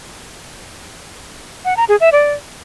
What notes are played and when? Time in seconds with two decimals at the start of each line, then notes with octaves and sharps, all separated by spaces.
1.65 F#5
1.77 A#5
1.88 G#4
2.00 E5
2.12 D5